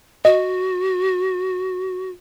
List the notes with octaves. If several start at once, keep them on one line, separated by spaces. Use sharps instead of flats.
F#4 D#5